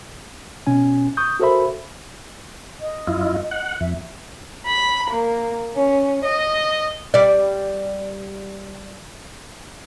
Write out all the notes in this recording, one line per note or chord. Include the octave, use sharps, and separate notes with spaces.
B2 C#4 G#5
C#6 D#6 G6
F#4 A4 A#4 C5 E5 B5
D#5
F#2 E4 F4
F#5
F2 E5
B5
A#3
C#4
D#5
G3 D5